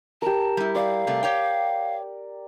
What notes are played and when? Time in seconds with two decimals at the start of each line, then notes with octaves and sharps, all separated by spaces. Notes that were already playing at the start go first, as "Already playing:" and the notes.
0.22 G4 A#4 A5
0.57 G3 E4
0.75 D5 F5
1.07 C3 G3 A3
1.23 G4 C#5 G5